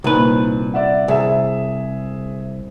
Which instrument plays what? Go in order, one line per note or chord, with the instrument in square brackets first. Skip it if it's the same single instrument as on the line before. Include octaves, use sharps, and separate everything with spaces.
[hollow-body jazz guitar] C2 B4 [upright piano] A#2 D#3
[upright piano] D5 E5 F#5
[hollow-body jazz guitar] C2 [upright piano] G#4 E5